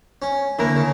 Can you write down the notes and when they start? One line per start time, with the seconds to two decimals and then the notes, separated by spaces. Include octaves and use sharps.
0.22 C#4
0.59 D3 A#3 E4 A#4 C#5
0.75 C#3